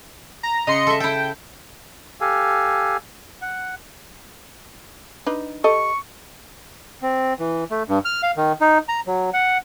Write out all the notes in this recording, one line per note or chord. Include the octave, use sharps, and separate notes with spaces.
A#5
C#3 D#5 C6 C#7
A4 E5
E4 A4 G5
G4 A4 F5 G#5
F#5
D4 D#4 B4
G4 A4 D#5 C#6
C4
E3
A3
G2
F6
F5
D#3
D#4
A#5
F#3
F#5